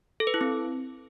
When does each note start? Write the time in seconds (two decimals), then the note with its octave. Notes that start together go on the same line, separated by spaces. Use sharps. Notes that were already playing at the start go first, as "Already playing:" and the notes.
0.20 A4
0.27 B4
0.34 E4
0.41 C4